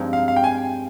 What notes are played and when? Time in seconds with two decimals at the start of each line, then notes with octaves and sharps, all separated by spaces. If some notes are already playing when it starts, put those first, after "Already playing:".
Already playing: G2 F3 G#3 C4 D#4
0.13 F5
0.28 F5
0.36 G5
0.44 G#5